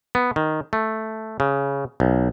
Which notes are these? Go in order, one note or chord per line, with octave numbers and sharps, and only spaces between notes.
B3
D#3
A3
C#3
B1